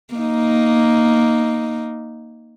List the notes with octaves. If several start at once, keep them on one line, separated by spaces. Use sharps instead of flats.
A#3 D#4